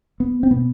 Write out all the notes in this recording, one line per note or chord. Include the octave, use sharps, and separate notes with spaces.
B3
C4
B2 B3